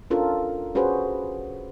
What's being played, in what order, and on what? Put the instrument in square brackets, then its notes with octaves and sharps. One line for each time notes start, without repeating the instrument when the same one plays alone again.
[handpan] C#4 D4 F4 A4 A#4
C#4 F#4 G#4 B4 C5